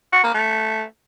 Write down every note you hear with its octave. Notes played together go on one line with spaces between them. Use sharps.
F#4
A#3
A3